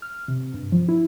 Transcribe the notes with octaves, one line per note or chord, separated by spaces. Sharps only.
F6
C3
G2
F3
E4